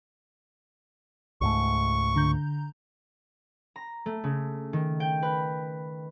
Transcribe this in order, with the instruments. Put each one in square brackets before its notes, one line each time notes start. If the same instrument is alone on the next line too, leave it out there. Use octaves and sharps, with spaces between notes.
[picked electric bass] C#2 G#2 A3 [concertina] C#6
[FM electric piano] D3 A#5 G6
[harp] A#5
A3
C#3
D#3
G5
B4